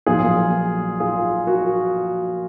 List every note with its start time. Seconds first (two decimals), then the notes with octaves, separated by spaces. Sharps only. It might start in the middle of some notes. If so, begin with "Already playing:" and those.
0.06 A#1 A#2 F#3 F4 G#4
1.00 F4 G#4
1.47 F#4 A#4